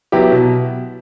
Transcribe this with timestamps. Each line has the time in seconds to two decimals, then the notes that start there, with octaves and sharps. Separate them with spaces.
0.12 F#3 B3 E4 G4
0.32 B2